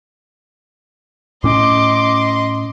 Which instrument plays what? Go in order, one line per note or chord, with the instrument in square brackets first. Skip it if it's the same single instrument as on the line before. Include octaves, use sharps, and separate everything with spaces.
[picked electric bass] A2 C#4 [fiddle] D#5 C6 [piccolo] D6